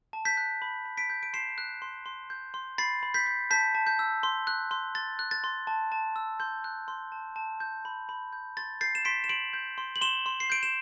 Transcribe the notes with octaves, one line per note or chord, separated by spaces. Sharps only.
A5
G6 B6
F#6
B5
B5
B6 D7
G6
D7
C6 C7 E7
F#6
C6
C6
G6
C6
B5 A6 C7
B5
G6 B6
G6
A5 G6 B6
A5
G6
E6
C6
F#6
C6
C6 A6
F#6
A6
C6
A5
A5
E6
C6 G6
F#6
C6
A5
A5
G6
B5
B5
G6
C6 A6
G6 A6 C7
E7
C6 B6 D7
E7
C6 D7 F#7
G6
C6
F#7
C6 E7 G7
C6
C7
G6 D7
E7